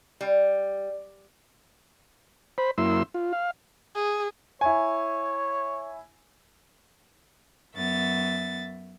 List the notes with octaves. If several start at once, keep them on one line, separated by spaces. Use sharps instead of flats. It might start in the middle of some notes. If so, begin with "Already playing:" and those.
G3
C5 B5
F#2 A#3 E4 C6 E6
F4
F5
G#4
E4 C#5 G#5
F#2 B3 E5 A6